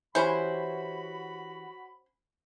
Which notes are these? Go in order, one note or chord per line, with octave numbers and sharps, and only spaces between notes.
E3 C#4 E4 F#4 G4 C5 B5